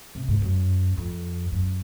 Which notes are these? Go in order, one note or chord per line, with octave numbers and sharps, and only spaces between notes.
C3
G#2
F#2
F2
F#2